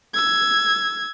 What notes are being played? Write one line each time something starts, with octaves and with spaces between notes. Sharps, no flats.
E6 G#6